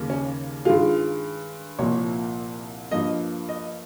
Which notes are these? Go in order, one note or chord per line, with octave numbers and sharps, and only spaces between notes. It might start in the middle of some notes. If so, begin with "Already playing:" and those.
Already playing: D#2 C#3 G3 A#3
C#4
G2 D#3 G#3 F4
C2 A#2 F3 A#3 C#5
G2 F3 A#3 D#5
D#5